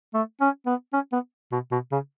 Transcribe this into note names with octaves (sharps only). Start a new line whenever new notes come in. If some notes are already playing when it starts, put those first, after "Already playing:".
A3
C#4
B3
C#4
B3
B2
B2
C#3